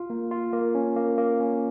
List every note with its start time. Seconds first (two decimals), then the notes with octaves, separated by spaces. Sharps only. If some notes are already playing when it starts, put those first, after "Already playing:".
Already playing: F4
0.10 A#3
0.31 F4
0.53 A#3
0.75 C#4
0.96 A#3
1.18 A#3
1.40 C#4